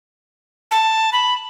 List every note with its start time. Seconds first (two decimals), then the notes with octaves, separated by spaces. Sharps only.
0.71 A5
1.13 B5